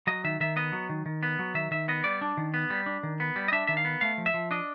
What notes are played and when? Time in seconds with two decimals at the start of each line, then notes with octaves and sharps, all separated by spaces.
0.07 F#3 D#5
0.24 D#3 E5
0.40 D#3 E5
0.56 B3 D#5
0.72 F#3
0.89 D#3
1.06 D#3
1.23 B3
1.39 F#3
1.54 D#3 E5
1.71 D#3 E5
1.88 B3 D#5
2.04 G3 D5
2.21 D4
2.37 D#3
2.54 B3
2.70 G3
2.86 D4
3.03 D#3
3.20 B3
3.36 G3
3.48 D#5
3.52 D4 E5
3.67 D#3 E5
3.77 F5
3.85 B3
4.01 A3 F5
4.18 F3
4.26 E5
4.34 F3
4.51 D4 D#5